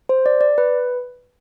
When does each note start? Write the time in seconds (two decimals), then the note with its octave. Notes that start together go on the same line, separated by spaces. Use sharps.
0.09 C5
0.26 D5
0.41 D5
0.58 B4